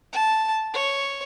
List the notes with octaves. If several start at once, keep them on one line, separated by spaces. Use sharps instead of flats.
A5
C#5